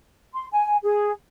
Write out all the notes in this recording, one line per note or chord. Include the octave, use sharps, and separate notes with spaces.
C6
G#5
G#4